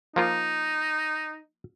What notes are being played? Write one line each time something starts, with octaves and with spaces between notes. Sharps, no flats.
F3 A#3 D#4 F4